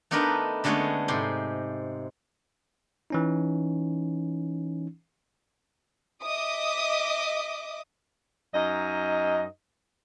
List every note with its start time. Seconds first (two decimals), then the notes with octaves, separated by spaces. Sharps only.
0.11 A3 B3 D4 D#4 A#4 B4
0.64 D3 G#3 A3 B3 C#4 G#4
1.08 G#2 C3 C6
3.10 E3 C#4 D#4
6.23 D#5 E5 D6 D#6
8.54 F#2 D#4 D#5